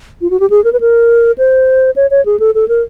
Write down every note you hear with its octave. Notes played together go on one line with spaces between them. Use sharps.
F4
F#4
G4
G#4
A#4
B4
A#4
C5
C#5
C#5
G#4
A4
A4
A#4